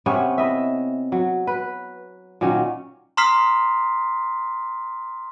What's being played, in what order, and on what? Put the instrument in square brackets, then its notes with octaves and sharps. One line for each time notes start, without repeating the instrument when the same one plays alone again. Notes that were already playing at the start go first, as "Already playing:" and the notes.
[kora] C3 B3 C#4 C#5
E4 D#5 E5
F#3
B4
A#2 D#3 F#3 C#4
[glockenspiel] A#5 C6 D#6 F6 B6 C7